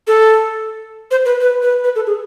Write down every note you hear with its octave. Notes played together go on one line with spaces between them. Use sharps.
A4
C5
B4
B4
B4
B4
A4
G#4